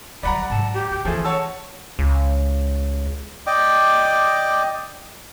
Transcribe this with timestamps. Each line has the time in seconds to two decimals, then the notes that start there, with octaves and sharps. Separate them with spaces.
0.23 F#3 G3 D5 F#5 A#5 B5
0.50 G#2 A5
0.74 G4
0.91 D3 G4
1.05 E3 F3 A3 C#4 G#4
1.24 C#5 F#5 A5 E6
1.99 C#2
3.47 D5 D#5 G5 D6